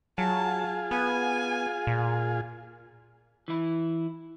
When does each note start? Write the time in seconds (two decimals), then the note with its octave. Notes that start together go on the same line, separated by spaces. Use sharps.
0.18 F#3 F4 G#4 A5
0.91 B3 G#5
1.87 A#2
3.48 E3 E4